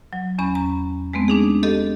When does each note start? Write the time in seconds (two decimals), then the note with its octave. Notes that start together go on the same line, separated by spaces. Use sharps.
0.13 F#3
0.38 E2 C#4 B5
0.55 A#5
1.13 G#3 A3 B3 C4
1.28 D4 D#4 G#4
1.63 G4 A4 D#5